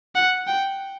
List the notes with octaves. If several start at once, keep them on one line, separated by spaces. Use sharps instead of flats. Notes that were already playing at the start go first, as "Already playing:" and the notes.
F#5
G5